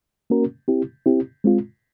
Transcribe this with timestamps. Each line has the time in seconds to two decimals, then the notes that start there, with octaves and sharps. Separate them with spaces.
0.30 A#3 C#4 F#4 A#4
0.68 C4 E4 G4
1.06 C4 E4 G4
1.44 G#3 C4 F4